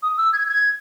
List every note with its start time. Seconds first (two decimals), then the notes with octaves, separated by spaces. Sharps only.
0.03 D#6
0.18 E6
0.33 G#6
0.48 G#6